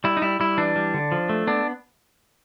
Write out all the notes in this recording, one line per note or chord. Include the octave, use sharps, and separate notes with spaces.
G3 E4
D#4
G3 E4
G3 E4
E3 D4
G3
D3
F3
A3
B3 D4